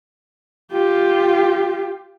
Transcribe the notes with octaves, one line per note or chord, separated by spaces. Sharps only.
F4 G4